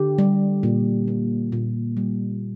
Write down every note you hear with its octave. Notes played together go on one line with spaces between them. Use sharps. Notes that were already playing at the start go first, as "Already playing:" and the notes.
Already playing: D3 G4
G3
A#2
A#3
A#2
G3